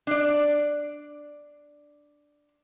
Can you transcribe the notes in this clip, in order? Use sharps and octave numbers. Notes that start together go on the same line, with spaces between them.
D4 D5